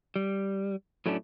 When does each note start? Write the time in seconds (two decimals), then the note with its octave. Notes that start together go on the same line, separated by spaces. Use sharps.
0.16 G3
1.06 A2 F#3 A3 C#4 D4